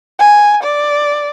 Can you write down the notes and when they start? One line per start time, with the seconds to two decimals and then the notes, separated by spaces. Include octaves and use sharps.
0.19 G#5
0.63 D5